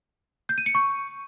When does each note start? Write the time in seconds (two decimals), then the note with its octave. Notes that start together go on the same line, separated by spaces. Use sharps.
0.49 G6
0.58 D#7
0.66 C#7
0.75 C#6